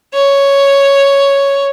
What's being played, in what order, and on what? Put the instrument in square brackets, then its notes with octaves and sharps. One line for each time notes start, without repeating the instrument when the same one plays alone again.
[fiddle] C#5